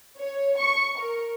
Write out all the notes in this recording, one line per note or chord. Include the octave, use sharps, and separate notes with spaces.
C#5
C#6
A#4